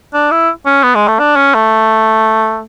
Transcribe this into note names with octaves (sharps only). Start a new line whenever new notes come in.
D4
E4
C#4
B3
G#3
A3
D4
C#4
A3